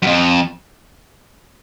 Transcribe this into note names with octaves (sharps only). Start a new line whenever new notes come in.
F#2
F2